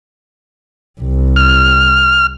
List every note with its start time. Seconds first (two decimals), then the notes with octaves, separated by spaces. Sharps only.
1.01 C2
1.36 F6